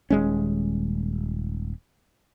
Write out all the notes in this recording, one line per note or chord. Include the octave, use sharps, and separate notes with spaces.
D#1 G#3 C#4